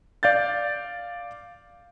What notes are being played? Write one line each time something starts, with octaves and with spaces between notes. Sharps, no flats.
D5 F5 G6 A6